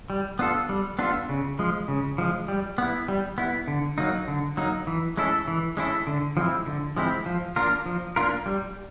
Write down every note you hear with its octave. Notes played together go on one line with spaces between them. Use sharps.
G3
B3 D4 F4 A4
G3
B3 D4 F4 A4
C#3
F3 G#3
C#3
F3 G#3
G3
B3 E4
G3
B3 E4
D3
F#3 A#3 D#4
D3
F#3 A#3 D#4
E3
G#3 C#4 E4 A4
E3
G#3 C#4 E4 A4
D3
F3 G#3 C4 E4
D3
F3 G#3 C4 E4
F3
A#3 D4 F4 A#4
F3
A#3 D4 F4 A#4
G3